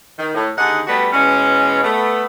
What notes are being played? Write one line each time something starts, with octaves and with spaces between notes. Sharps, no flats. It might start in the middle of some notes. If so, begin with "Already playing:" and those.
D#3
A2
D#2 D3 D#4 G#4 F#5
G3 A3 B3 D4 F#4 B4
B2 E3 G#3 C#4
A3 B3